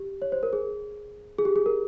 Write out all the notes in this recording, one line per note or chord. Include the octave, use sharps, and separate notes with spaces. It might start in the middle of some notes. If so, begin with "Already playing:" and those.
Already playing: G4
C#5
C5
A#4
G#4
G#4
G4
G#4
A#4